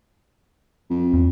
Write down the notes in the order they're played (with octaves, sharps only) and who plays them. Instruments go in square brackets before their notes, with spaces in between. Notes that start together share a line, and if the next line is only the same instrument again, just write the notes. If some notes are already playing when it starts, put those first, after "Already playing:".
[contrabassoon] F2
[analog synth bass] E2